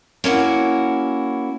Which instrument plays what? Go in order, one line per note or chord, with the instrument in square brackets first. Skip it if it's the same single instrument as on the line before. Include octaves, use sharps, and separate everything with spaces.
[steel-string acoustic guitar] A#3 C#4 E4 F#4